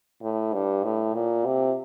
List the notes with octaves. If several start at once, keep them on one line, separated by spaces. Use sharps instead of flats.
A2
G2
A2
A#2
C3